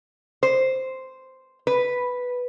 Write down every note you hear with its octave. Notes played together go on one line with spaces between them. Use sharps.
C5
B4